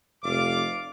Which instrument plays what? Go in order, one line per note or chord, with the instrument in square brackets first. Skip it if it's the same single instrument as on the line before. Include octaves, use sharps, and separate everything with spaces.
[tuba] F1 [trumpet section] D5 F5 D6